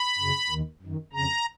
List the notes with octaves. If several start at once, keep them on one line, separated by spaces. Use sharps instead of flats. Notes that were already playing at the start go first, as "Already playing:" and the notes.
Already playing: B5
F#2 C#3
D#2 D#3
F#2 D#3
F2 C#3 A#5